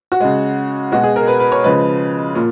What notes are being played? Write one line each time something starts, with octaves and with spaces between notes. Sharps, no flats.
F#4
C#3 G#3
B2 G#3 F#4
G#4
A#4
B4
B4
C#5
C#3 F3 G#3 B4
A#2